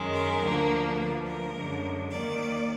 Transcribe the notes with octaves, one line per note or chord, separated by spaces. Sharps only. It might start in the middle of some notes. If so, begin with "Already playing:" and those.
Already playing: F#2 D#3 G#3
A#4
D2 D3 F3 A#3
D2 D3 F3 B4
A#4
F#2 D3 G#3
D#2 D#3 A#3 D5